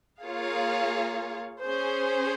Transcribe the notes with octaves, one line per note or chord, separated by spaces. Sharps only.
A#3 F4 G#4 C#5 F5
C#4 G#4 C5